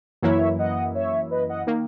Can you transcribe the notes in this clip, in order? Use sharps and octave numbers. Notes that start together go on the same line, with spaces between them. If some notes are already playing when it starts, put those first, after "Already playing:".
F#2 E3 A#3 E4 C#5 E5
D#5 F#5
C#5 E5
B4 D#5
D#5 F#5
D#3 A#3